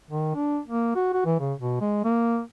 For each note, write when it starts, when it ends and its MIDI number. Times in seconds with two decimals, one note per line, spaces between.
0.11 0.34 51
0.35 0.60 62
0.68 0.93 58
0.95 1.11 66
1.14 1.26 66
1.26 1.36 52
1.40 1.53 49
1.59 1.78 47
1.81 2.02 56
2.04 2.41 58